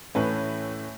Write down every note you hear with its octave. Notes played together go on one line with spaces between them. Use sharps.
A2 E3 A3 C#4 B4